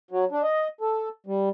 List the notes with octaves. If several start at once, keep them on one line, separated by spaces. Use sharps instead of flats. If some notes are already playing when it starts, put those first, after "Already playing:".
F#3
D4
D#5
A4
G3